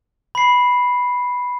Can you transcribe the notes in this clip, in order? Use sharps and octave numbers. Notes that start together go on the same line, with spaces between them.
B5 C7